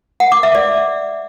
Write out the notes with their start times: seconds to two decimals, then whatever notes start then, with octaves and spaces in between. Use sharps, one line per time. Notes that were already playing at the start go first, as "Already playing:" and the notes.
0.20 F#5
0.32 D6
0.43 E5
0.55 D5